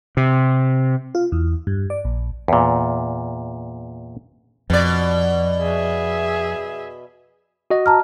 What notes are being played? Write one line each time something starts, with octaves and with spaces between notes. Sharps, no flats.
C3
F4
E2
G2
D5
A#1
E2 A#2
F2 B2 D5
G#4 E5
F#4 D#5
A5 A#5 F6